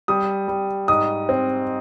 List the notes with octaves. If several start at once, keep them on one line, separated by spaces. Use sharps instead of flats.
G3 D#6
G3
G#2 D#6
C4